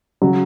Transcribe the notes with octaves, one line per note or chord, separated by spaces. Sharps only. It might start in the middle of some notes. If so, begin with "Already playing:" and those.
C#3 F#3